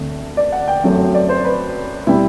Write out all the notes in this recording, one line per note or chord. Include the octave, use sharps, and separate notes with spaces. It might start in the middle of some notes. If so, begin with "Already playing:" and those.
Already playing: D2 D3 A3 C4
D5
F#5
G5
F#2 F#3 A3 C4
D5
C5
B4
B2 G3 C4 E4